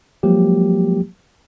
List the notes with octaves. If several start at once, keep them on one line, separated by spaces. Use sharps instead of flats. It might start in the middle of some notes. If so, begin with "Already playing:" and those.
F3 F#3 G#3 A#3 G4